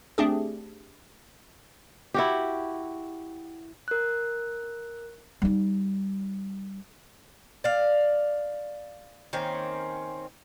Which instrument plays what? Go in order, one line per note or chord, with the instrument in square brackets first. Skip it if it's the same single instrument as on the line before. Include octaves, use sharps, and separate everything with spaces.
[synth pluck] A3 C4 D4 G4 G#4
[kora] E4 F#4 G4
[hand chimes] A#4 F#6
[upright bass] G3 D#4
[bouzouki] D5 F5
D#3 A#3 C4 C#4